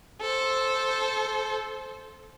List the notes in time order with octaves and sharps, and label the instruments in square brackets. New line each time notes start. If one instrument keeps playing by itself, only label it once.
[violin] A4 C5